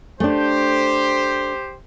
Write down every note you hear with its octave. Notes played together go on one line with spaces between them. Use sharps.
A3 D4 G4 C5